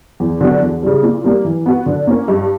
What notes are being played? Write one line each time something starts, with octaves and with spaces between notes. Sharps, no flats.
E2
D3 F#3 B3 F#4
E2
C#3 G3
A#2
G3 A#3
E3
B3 F#4
D3
A#3 C#4
G2